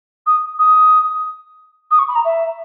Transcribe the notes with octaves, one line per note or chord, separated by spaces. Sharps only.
D#6
D#6
D#6
C#6
B5
A#5
E5